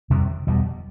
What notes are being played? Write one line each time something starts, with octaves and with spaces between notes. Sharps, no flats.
F2 C3 D#3 G3
E2 B2 G3